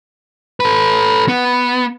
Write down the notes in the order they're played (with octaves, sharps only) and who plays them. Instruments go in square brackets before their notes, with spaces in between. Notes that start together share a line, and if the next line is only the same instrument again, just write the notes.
[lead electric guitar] A4 B4
B3